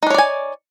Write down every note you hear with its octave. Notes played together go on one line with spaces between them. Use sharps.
D4 D#4 C#5 D5 G#5